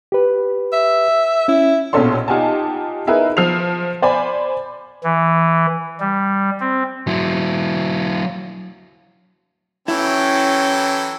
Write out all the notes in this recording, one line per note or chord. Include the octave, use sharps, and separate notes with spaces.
G4 B4
E5
C#4 E4
A#1 B2 C#4 A4 C#5 C6
D#4 F4 G4 F#5 G#5 A5
D#4 E4 G#4 A#4 B4
F3 C7 F7
C5 D5 G#5 B5
E3
G3
C4
F#3 E4
E3 F#3 C#4 E4 A4 G5